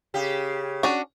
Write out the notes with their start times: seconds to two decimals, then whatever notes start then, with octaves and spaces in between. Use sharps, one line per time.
0.14 C#3 G4
0.83 C#4 D4 F#4